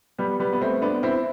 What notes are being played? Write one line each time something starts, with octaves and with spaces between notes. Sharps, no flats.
G3 B3
G3 B3
B3
A3 C4
B3 D4
C4 E4